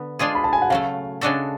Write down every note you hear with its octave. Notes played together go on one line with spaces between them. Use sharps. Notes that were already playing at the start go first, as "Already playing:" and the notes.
Already playing: D3 B3
G#3 D4 F4 G#4
B5
A5
G#5
F#5
C#3 F#3 A3 F5
C#3 G#3 D4 F#4 A4